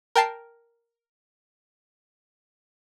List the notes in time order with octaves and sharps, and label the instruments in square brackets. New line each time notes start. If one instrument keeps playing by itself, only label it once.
[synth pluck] A#4 G5 A5 C7